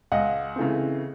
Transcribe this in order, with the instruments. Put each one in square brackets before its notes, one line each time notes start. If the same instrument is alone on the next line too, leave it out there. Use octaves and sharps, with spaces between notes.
[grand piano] C#2 D#5 F#5
C#3 E3 A3 C4